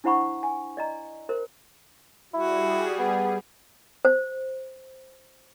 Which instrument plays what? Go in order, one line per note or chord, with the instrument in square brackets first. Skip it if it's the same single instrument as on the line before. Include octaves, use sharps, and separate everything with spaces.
[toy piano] D4 E4 C5 F#5 B5 C#6
G#5
D5 D#5 A#5
A#4 C5
[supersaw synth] G3 G#4 [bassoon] E4 [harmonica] F#4
[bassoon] B3
[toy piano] C5